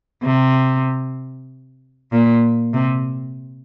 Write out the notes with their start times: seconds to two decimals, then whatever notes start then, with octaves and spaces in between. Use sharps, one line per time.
0.23 C3
2.12 A#2
2.74 C3